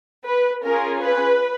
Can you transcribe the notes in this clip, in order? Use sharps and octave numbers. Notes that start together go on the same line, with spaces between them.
B4
C#4 F4 G#4 A#4
B4